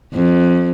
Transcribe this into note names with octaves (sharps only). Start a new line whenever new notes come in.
F2